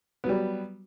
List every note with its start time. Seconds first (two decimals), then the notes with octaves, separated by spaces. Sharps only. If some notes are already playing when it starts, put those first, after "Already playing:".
0.24 B3
0.26 F#3
0.29 G3